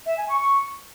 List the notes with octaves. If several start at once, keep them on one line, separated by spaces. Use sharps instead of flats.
E5
G#5
C#6
C#6